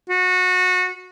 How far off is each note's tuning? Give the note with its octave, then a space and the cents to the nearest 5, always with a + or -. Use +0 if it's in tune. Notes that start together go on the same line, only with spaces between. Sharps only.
F#4 -20